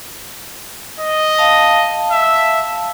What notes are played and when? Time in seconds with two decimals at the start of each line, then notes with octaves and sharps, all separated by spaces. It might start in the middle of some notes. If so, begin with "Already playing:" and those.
1.00 D#5
1.38 F5 A5
2.12 E5